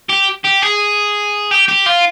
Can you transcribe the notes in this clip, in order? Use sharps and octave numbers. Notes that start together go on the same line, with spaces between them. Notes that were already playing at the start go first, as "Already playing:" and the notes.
G4
G4
G#4
G4
G4
F4